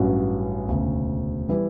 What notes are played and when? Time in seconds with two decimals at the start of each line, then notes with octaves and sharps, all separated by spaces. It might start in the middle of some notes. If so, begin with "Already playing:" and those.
Already playing: A1 G2 F#3 C#4 F#4
0.67 E1 D2 C#3
1.49 E3 G3 B3 E4